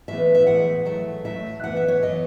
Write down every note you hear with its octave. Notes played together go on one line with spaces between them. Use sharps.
A2 E3 G#3 B3 E5
E5
A2 E3 G#3 B3 F#5
A2 F#3 A3 E5
A2 F#3 A3 E5
F#2 E3 B3 F#5
E5
C#5
F#2 E3 B3 D#5